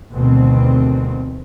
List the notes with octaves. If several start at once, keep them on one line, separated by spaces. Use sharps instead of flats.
D2 B2 D#3 E3 G3 C4